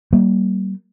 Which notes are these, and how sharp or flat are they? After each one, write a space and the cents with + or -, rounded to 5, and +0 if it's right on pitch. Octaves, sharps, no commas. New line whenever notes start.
G3 -35 A#3 +0